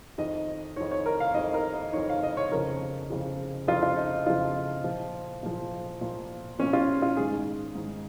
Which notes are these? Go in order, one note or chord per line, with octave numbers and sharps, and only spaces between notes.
F2 D#3 D#5
F2 D#3 C#5
C#5
A#4
F5
F2 D#3 D#5
A#4
D#5
F2 D#3 C#5
F5
D#5
C#5
F2 C#3 F3 A#4
F2 C#3 F3
F2 C#3 F3 F4
F4
D#4
D#4
F2 C#3 F3 F4
A#2 F3
A#2 F3
A#2 F3
A#2 F3 C#4
F4
F4
G#2 D#3 G#4
G#2 D#3